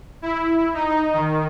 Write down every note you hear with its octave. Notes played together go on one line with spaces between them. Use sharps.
E4
D#4
D#3